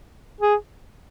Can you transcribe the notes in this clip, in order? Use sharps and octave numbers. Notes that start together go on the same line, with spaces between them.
G#4